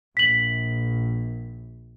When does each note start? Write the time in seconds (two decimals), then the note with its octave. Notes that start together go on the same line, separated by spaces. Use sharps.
0.17 A#1 B6 F#7